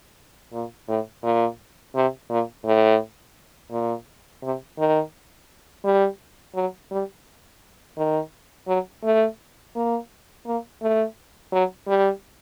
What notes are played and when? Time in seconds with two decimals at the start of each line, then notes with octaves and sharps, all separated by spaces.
0.53 A#2
0.88 A2
1.23 A#2
1.95 C3
2.30 A#2
2.65 A2
3.71 A#2
4.42 C3
4.78 D#3
5.85 G3
6.55 F#3
6.91 G3
7.97 D#3
8.68 F#3
9.03 A3
9.75 A#3
10.46 A#3
10.82 A3
11.53 F#3
11.88 G3